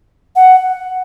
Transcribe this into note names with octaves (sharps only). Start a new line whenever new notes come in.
F#5